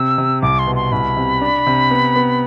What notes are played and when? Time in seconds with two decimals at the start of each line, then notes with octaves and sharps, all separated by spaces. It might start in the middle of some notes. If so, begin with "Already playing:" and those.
Already playing: C3 E6
0.18 C3
0.42 C2 D6
0.59 C6
0.67 B2
0.75 C6
0.92 C2 B5
1.17 C3
1.41 D4
1.67 C3
1.91 B3
2.16 B3